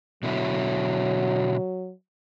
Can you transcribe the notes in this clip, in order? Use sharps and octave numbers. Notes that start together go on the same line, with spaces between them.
B2 D3 F#3 E4